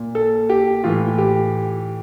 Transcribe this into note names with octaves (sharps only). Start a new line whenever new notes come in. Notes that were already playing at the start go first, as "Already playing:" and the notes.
Already playing: A#2
A4
G4
A2 E3 F4
G4